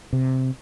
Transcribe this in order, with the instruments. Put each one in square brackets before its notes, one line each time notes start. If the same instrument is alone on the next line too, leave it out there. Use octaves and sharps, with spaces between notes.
[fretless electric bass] C3